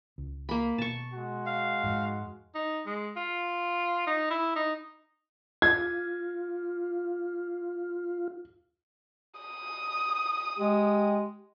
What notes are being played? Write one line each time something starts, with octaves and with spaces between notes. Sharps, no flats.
C#2
A#3 B5
B2 A5 C#6
G#3 F#4
F5
F2 G#2
D#4
G#3
F4
D#4
E4
D#4
F4 G#6
D#6
G#3 G4